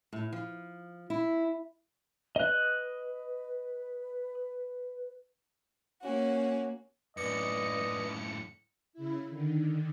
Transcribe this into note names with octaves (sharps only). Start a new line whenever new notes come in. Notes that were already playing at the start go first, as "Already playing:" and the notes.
A2
F3
E4
B4 D#5 F#6
A#3 C#4 F#4
F#2 A2 B4 D5 D#5 C#7
C#3 E4
D3 D#3